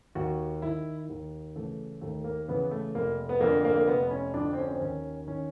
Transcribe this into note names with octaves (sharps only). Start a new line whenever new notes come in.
D#2 F#4
D#3 E4
D#2
C#3 E3 A3
D#2 A3
A#3
C#3 E3 B3
A3
F1 A#3
B3
F2 D3 A#3
A#3
A#3
F1 B3
C#4
F2 D3 D4
C4
C#4
C4
D#2 C#4
D#3 C#4